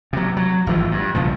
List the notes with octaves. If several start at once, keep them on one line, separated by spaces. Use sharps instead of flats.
C3 F#3
F#3
G#1 E3 F3
G2
B1 G2 C#3 F3